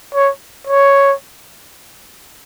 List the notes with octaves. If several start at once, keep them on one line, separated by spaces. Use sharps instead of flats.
C#5
C#5